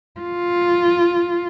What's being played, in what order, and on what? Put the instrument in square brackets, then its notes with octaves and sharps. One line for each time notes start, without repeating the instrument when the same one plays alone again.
[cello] F4